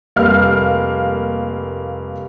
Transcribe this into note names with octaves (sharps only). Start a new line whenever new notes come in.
F1 G3 A#3 F5 F6